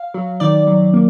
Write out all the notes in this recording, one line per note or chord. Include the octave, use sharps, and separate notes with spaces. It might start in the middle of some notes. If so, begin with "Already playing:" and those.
Already playing: F5
F#3
D#3 D5
F#3
A#3